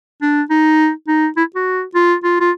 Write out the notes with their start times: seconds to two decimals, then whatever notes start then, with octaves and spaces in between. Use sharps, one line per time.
0.22 D4
0.50 D#4
1.08 D#4
1.37 E4
1.56 F#4
1.95 F4
2.24 F4
2.40 F4